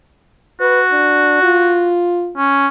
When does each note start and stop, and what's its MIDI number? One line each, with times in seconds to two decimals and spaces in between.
0.61 1.93 66
0.61 0.81 71
0.92 1.42 62
1.43 2.33 65
2.37 2.67 61